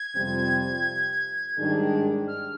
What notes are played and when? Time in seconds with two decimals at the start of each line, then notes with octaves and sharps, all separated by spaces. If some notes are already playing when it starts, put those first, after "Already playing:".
Already playing: G#6
0.15 F2 C3 G3 C4 F4
1.56 G#2 D#3 G3 D4 G#4
2.27 F6